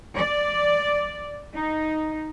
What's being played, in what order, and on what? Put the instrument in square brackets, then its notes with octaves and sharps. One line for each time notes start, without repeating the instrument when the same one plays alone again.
[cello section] D5
D#4